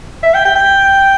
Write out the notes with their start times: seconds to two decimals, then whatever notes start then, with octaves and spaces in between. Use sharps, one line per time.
0.23 E5
0.34 G5
0.45 G5
0.56 G5